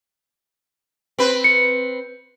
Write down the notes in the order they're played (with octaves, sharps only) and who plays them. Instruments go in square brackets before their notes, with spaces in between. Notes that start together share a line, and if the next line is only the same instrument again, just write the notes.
[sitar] C4 B4
[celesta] C#7